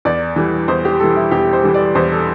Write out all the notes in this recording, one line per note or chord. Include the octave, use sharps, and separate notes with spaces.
E2 D5
E3 G3
E2 C5
G4
E3 G3 A4
E4
E2 G4
C5
E3 G3
D5
E2 C5
A4